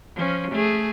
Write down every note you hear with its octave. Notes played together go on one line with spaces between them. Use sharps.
F3 C#4
A3 G#4